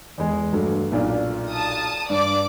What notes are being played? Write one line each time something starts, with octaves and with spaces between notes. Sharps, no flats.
E2 G#3 G#4
G2 F#3 A3
B1 A#2 D4
A5 D#6
G2 D5 D6